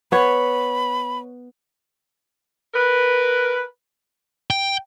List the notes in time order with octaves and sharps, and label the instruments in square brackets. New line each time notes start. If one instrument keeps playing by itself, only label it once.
[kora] B3 C#5 [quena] B5
[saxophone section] A#4 B4
[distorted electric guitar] G5